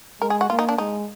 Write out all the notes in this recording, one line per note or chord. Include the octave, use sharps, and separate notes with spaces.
G#3 A#4
G#4
F#4
A#3 F4
D#4
D4
G#3 D#4